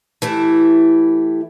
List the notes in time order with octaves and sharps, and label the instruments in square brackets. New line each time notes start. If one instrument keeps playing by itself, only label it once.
[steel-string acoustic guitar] E3 A3 E4 G4